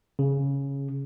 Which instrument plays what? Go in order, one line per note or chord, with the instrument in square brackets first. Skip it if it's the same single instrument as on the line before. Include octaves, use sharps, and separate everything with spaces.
[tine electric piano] C#3